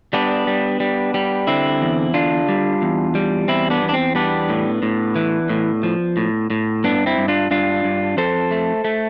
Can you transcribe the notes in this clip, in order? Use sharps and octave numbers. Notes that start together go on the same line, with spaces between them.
G3 B3 D4
G3
G3
G3
D3 C4 E4
E2
D3 D4 F4
G3
E2
G3
E2 C4 E4
B3 D4
E2
D4
C4
G3 B3 D4
A2
A2
E3
A2
F3
A2
A2
G2 B3 D4
C4 E4
G2
D4 F4
G2 D4 F4
G2
F2 A4 C5
A3
A3